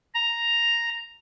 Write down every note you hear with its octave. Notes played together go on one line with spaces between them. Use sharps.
A#5